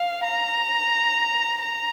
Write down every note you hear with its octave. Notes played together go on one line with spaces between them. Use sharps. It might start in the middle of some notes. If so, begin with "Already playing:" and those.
Already playing: F5
A#5
A#5